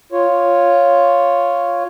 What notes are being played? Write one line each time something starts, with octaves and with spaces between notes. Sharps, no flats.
F4 C#5